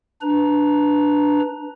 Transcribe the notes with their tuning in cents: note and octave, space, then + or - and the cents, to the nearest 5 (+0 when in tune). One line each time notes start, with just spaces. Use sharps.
D4 +0 B4 +0 A#5 +15